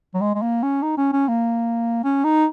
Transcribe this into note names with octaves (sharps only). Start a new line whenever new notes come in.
F#3
G#3
G#3
A#3
C#4
D#4
C#4
C#4
A#3
C#4
D#4